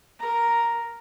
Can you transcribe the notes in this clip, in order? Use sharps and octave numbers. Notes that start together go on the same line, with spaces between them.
A#4 A#5